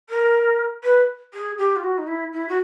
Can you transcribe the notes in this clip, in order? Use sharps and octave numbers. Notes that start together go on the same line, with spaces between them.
A#4
B4
G#4
G4
F4
F#4
D#4
E4
E4
F#4